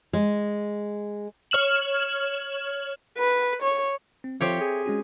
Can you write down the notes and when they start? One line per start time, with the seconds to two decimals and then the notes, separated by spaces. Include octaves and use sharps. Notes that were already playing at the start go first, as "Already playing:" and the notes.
0.13 G#3
1.51 C#5 F6 E7 F#7
3.18 B4
3.63 C#5
4.24 C4
4.41 F3 C4 G4 A4 C#5 E5
4.60 G#4
4.86 G#3 C#4 F#4